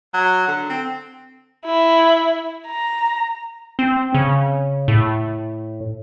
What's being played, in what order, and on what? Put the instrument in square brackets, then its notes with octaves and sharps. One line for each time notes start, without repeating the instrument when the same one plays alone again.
[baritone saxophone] F#3
D3
C4
[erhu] E4
A#5
[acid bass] C4
C#3
A2